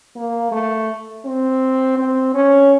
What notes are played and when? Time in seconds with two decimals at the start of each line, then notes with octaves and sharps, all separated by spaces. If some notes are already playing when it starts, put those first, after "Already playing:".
0.16 A#3
0.52 A3
1.25 C4
1.98 C4
2.34 C#4